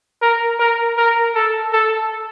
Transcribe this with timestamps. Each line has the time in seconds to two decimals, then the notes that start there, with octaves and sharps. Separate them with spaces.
0.22 A#4
0.60 A#4
0.97 A#4
1.35 A4
1.73 A4